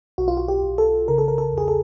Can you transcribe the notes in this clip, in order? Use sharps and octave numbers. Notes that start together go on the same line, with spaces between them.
B1 F#4
F4
F#4
G4
B1
A4
C#3 A#4
A4
A#4
A4
E2 G#4
A4